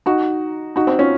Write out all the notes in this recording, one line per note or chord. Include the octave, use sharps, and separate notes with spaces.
D#4 F#4
D#4 F#4
C4 D#4
C#4 F4